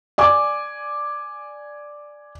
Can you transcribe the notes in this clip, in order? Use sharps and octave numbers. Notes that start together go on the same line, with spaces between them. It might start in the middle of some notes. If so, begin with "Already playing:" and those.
D5 G#5 D6